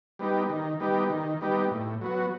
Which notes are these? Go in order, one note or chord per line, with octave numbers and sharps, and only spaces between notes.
G3 B3 D#4 G4
D#3
G3 B3 D#4 G4
D#3
G3 B3 D#4 G4
A2
F#3 B3 F#4